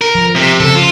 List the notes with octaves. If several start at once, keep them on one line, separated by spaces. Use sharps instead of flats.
A#4
F3
C3
C#3 A4
F4